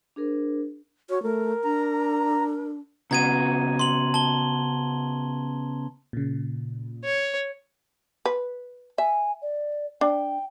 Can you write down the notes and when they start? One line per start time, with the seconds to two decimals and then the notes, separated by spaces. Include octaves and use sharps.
0.16 D4 G#4 A#4 C5
1.10 F#4 C#5
1.23 A3 A#4
1.64 D4 A#5
3.11 C#3 B3 F#4 A#5 G#6 D#7
3.79 C6 F#7
4.14 A5 G7
6.13 A#2 C#3
7.04 C#5
8.25 B4
8.98 E5 G#5
9.42 D5
10.01 D4 G5